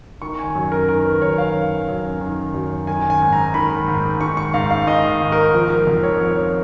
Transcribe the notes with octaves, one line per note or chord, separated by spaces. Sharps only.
D#3 C#6
G#5
F#2
A#4
D#3 A#4
B4
F#2 C#5
F5
D#3
F#2
D#3
F#2
D#3 G#5
G#5
G#2
A#5
D#3 B5
G#2
D#3 C#6
C#6
G#2 F5
F5
D#3 D#5
G#2
A#4
F3
A#4
F2
C#5
F3 C#5